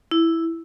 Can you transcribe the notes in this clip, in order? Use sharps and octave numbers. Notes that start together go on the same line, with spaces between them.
E4